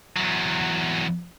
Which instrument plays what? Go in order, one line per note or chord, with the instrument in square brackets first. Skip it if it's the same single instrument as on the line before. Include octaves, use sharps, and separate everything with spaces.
[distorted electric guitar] E2 F#3